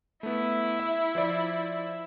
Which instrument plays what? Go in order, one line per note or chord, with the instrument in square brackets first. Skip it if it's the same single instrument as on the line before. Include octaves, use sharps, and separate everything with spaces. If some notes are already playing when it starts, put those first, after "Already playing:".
[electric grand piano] A3 B3 [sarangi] E4
[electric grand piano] E5
F3 C5 D5